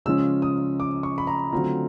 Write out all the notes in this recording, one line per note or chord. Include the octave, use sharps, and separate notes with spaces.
C#3 F3 G#3 C#4 F4 E6
D#6
D6
C#6
B5
A#5
D3 F#3 A3 C4 F4 A#5